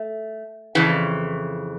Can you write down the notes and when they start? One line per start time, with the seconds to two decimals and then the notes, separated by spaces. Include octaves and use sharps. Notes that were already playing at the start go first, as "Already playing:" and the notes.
Already playing: A3
0.75 F2 C#3 E3